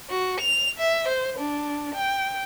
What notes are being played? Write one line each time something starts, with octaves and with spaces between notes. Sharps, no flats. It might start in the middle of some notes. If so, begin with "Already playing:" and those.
F#4
F7
E5
C5
D4
G5